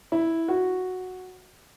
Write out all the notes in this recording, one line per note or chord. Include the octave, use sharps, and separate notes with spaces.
E4
F#4